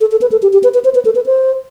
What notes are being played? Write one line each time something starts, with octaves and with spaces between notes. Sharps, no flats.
A4
A4
B4
A4
G4
G4
B4
B4
C5
B4
A4
B4
C5